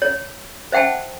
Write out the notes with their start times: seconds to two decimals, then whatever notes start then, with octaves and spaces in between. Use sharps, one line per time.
0.02 C#5
0.72 C5 E5 F#5 G5 A5